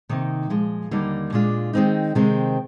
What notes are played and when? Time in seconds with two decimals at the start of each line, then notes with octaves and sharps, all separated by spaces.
0.09 C3 D#3 A#3 D#4
0.50 A#2 F3 G#3
0.91 D#2 D3 G3 A#3 D#4
1.32 A#2 G#3 D4 F4
1.73 D#3 G#3 C4 D#4
2.15 C3 D#3 G#3 C4